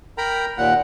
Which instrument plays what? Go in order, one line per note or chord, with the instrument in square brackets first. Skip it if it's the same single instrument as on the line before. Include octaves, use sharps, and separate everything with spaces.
[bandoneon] A#4 G5 A#5 B5
D#2 A#2 F#5